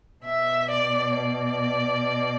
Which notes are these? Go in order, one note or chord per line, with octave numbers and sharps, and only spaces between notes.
B2 E5
D5
D5